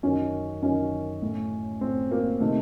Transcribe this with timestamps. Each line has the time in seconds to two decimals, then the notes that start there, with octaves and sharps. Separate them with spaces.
0.03 F#2 D#3 C#4
0.62 F#2 D#3 C#4
1.22 A2
1.81 A2 C4
2.11 A#3
2.40 C3 D#3 A3